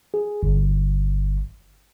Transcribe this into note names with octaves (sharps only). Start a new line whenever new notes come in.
G#4
G1